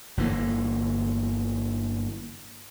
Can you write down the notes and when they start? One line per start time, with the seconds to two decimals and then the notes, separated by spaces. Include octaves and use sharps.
0.17 G1 D3 E3 A#3